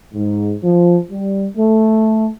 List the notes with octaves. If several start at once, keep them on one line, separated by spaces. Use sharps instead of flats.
G#2
F3
G3
A3